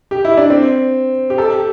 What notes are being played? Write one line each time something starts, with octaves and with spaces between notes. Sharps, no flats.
G4
E4
D4
C4
G4
A4
G4